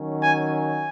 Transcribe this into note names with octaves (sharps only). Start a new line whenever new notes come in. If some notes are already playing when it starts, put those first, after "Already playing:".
Already playing: D#3 F#3 C#4
G#5
G#5